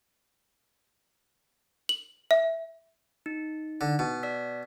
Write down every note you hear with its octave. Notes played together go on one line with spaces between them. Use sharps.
F#7
E5
D#4
D3
B2
D5 E6 B6